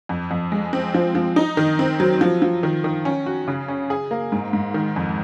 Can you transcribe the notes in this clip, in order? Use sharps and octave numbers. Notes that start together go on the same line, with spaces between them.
F2
F2
G#3
C4
F3
F3
D#4
D#3
C4
F#3
F3
F3
D#3
D#3
C#4
F#4
C#3
C#4
G#4
A#3
G#2
G#2
D#3
F2